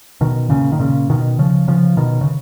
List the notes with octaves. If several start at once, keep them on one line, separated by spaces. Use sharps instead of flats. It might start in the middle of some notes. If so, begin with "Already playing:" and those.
B2 D#3
A#2 C#3
D#3
A#2 C#3
B2 D#3
C#3 F3
C#3 F3
B2 D#3
C#3